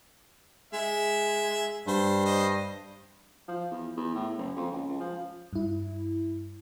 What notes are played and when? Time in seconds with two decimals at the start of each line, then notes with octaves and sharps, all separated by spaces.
0.73 G#3 E5
1.87 G2 C5
2.25 C5 D#5
3.48 F3
3.71 E2
3.97 E2
4.15 A2
4.37 F#1
4.56 F2
4.71 C#2
4.88 C#2
5.00 F3
5.53 G2 E4